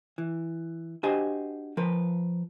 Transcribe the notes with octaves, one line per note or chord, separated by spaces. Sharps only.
E3
D4 F#4 G4 C5 D#5 G#5
F3 A#4 B4